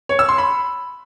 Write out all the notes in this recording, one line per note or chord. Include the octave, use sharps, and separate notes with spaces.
C#5
E6
C6
B5